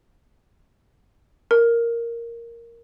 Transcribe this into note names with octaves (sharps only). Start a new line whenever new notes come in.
A#4